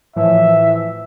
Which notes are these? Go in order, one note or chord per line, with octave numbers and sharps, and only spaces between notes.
A2 E3 F3 E5